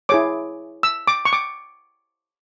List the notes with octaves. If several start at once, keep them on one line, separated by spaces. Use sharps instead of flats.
E4 G#4 C#5 D6
E6
D6
C#6
D6